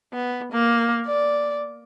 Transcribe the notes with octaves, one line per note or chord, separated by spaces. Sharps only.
B3
A#3
D5